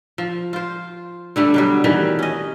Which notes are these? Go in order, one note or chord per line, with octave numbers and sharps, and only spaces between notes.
F3
F4 C5
D3 G3 A3
B2 F#3 G3
D#3 E3 G3
C#4 D#5